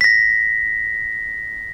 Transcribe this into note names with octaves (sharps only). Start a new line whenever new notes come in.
A#6 B6